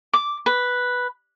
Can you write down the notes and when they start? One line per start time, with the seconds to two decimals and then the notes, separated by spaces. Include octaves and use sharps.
0.13 D6
0.46 B4